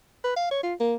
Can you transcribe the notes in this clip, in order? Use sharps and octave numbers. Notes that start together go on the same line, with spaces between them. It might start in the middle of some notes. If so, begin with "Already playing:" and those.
B4
F5
C#5
F4
A#3